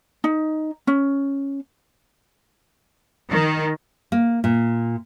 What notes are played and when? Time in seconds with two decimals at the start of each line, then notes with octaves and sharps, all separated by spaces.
0.24 D#4
0.87 C#4
3.31 D#3
4.12 A#3
4.44 A#2